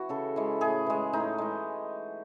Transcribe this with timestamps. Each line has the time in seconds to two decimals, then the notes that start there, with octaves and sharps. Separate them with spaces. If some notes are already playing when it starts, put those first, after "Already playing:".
Already playing: E3 F#4
0.09 C#3 A4
0.36 E3 G#3
0.61 A2 G#4
0.87 E3 G#3
1.13 A2 D#4
1.38 E3 G#3